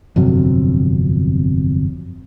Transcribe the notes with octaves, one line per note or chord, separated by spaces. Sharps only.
G1 F2 C3 F#3